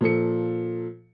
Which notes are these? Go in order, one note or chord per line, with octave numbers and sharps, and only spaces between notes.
A#2 F3 A4 C#7